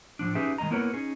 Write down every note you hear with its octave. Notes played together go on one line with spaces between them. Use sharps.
A2 F3 D4
C#4 D#4 G4 G#4 B4 E5
D#3 G#3 A#3 D#5 A#5
A#3 B3 E4 A#4 B4 C#5
C#4 D#4 G#4